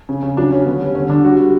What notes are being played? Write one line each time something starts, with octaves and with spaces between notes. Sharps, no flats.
C#3
C#3
F#3 D4
C#3 C#4
D3 B3
G3 C#4
D3 C#4
D3 D4
G3 F#4
G3